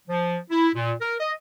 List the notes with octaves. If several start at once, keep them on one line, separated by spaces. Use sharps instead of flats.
F3
E4
A#2
A#4
D#5